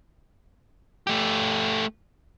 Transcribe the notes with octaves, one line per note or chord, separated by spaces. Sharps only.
A3 G4